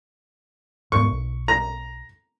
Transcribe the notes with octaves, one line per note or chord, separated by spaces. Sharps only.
D#1 G#2 B3 C#6
B1
A#5